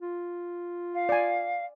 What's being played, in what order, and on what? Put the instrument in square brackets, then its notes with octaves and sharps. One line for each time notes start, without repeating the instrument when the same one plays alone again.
[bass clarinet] F4
[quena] F5
[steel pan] D5 G#5